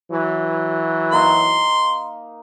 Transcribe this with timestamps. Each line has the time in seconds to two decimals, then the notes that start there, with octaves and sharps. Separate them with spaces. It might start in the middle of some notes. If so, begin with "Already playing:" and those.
0.12 E3 F#3
1.12 A#3 D#4 A#5 C6